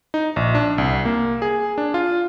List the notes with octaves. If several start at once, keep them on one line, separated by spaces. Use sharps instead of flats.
D#4
A#1
D4
C2
A#3
G#4
D4
F4